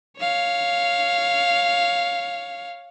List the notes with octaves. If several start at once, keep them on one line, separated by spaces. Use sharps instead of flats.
C#5 F5